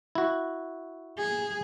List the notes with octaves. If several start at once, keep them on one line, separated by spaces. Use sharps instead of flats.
E4 F#4
G#4